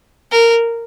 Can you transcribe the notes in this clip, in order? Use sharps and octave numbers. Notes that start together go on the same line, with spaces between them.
A#4